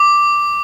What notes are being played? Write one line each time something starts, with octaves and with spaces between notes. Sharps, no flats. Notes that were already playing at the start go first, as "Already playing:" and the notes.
Already playing: D6